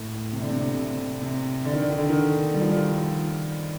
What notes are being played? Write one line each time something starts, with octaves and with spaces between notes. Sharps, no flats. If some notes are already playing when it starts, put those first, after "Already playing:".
Already playing: A2
C3
D3
C3
C3
C3
D3
D#3
D3
D#3
D3
D#3
G3
F3
D#3
F3